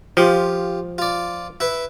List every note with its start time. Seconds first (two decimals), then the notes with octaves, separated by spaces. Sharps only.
0.17 F3 F4 G4
0.98 F4 D5
1.60 E4 B4